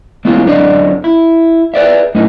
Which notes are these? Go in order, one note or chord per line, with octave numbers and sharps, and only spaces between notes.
E3 G#3 A#3 B3 C#4 F4
F#2 D3 D4 D5 D#5
E4
G#4 B4 D5 E5
F#2 A2 A#3 D#4